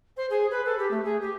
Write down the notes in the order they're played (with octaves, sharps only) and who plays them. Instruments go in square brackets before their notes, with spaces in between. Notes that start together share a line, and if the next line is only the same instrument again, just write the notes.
[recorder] C5
G#4
B4
A4
G4
A3
G#4
G4